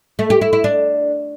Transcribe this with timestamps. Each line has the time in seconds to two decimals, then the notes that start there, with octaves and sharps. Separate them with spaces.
0.19 A3
0.30 G4
0.41 E4
0.53 E4
0.64 D4